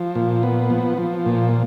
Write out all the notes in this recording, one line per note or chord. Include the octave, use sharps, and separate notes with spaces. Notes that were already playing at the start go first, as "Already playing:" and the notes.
Already playing: F3
A#2
B3
F3
F3
A#2